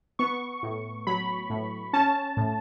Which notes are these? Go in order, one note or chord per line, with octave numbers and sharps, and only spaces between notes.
B3 C#6
A2
F#3 B5
A2
C#4 A5
A2